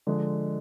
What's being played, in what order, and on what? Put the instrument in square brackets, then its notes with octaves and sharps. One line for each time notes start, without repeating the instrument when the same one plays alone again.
[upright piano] D3 F3 G#3